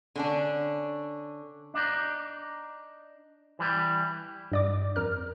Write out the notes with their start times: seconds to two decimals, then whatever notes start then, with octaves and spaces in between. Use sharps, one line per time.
0.16 D3 C#4 D4
1.74 D4 D#4
3.59 E3 G3
4.52 G2 D5 D6
4.96 F2 A#4 F6